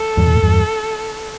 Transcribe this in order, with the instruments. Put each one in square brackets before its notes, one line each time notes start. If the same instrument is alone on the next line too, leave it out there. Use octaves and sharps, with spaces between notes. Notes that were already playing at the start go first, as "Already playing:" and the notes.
Already playing: [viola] A4
[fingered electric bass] E2 G2
B2
A2
E2 G2